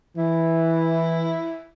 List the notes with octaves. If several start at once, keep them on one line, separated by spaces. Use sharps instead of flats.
E3 E4